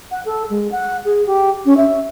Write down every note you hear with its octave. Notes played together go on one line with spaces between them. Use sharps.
F#5
A4
G#3
F#5
G#4
G4
C#4
E5